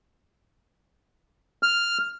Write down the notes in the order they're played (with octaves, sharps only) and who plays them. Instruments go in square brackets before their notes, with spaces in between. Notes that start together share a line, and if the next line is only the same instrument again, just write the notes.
[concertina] F6